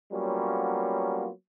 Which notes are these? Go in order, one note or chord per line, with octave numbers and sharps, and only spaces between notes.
F#3 G3 A#3 B3 C#4 F4